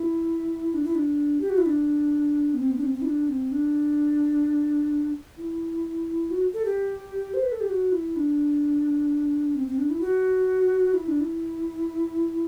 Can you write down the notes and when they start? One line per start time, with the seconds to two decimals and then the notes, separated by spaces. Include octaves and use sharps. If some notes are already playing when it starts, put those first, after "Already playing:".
Already playing: E4
0.74 D4
0.84 E4
0.95 D4
1.41 G4
1.50 F#4
1.58 E4
1.66 D4
2.54 B3
2.59 C4
2.71 B3
2.77 D4
2.82 C4
2.94 C4
3.02 E4
3.06 D4
3.29 C4
3.52 D4
5.37 E4
6.31 F#4
6.54 A4
6.65 G4
7.34 C5
7.43 B4
7.52 A4
7.61 G4
7.69 F#4
7.92 E4
8.16 D4
9.55 C4
9.67 C4
9.78 D4
9.90 E4
10.01 F#4
10.94 E4
11.08 D4
11.21 E4